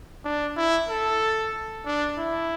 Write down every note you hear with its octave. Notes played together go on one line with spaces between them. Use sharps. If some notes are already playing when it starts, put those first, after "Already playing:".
D4
E4
A4
D4
E4